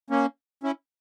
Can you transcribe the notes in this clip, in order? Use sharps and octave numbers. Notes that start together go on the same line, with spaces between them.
A#3 C#4
C#4 E4